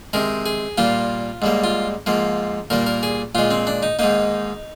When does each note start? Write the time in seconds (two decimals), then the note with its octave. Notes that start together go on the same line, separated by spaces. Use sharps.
0.13 C3 D#3 G#3 A#4
0.46 G#4
0.78 A#2 G3 A#3 F4
1.42 G#2 G3 A#3
1.64 F4
2.06 G#2 F3 A#3
2.70 A#2 G3 A#3 A#4
2.87 A#4
3.03 G#4
3.35 A#2 G#3 F4
3.51 C4
3.67 D4
3.83 D#4
3.99 G#2 D#3 A#3 D#4